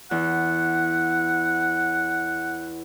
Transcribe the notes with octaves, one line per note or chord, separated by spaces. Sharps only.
E2 F#5